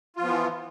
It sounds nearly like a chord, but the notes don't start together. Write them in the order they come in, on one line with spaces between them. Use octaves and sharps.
F4 F3 B3 E3